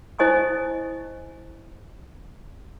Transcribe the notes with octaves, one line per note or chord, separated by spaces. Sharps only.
E4 C5 D#5 G#5 C#6 D#6